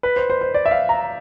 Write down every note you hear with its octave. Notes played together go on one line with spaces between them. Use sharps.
B4
C5
C5
C5
D5
E5
F5
A#5